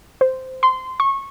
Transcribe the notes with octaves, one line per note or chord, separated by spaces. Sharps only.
C5
C6
C#6